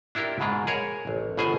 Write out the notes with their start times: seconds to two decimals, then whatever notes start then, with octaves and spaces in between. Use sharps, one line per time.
0.15 D4 E4 F4 G4 A#4
0.40 G#2 B2 G#3 F4
0.67 G#4 A#4 C#5
1.07 A1
1.37 G1 B2 G#4 C5 G#5